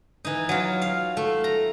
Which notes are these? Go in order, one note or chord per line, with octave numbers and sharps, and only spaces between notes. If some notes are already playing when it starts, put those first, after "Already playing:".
E3 D#4
F#3 F4
F5
A3
A#5